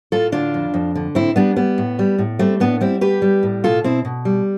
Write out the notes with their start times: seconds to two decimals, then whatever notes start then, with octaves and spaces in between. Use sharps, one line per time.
0.12 A2 F4 A4
0.32 D3 D4 F4
0.54 F2
0.74 F2
0.95 D3
1.15 A2 C4 E4
1.36 G3 B3 D4
1.56 G3 B3
1.78 A2
1.99 G3
2.18 A2
2.39 G3 A3 C4
2.60 A2 B3 D4
2.81 G3 C4 E4
3.01 G3 G4 B4
3.22 G3
3.43 A2
3.64 B2 F4 A4
3.84 B2 C4 E4
4.05 B2
4.25 G3